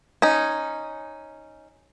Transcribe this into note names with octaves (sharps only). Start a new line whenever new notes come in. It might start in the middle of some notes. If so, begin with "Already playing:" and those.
C#4 D#4